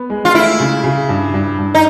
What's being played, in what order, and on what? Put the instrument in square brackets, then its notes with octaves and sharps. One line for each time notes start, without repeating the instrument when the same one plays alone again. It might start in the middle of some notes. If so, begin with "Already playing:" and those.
Already playing: [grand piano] B3
G#3
[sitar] F4
[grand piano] A3 [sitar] E4
[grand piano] C#3
C#3
G2
G2
G2
[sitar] D#4